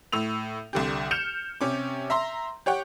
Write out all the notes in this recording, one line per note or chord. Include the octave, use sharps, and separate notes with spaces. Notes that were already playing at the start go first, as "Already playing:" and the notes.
A2 E6 F7
C2 D3 G4
F6 G6 C#7 E7 F7
C3 C#4 D6
E5 A#5 C6
G4 C#5 F#5 G5